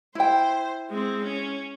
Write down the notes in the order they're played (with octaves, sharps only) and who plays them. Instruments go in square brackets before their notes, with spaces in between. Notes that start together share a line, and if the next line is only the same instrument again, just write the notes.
[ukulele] E4 G5 [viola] C5
[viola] G#3 C4
C#4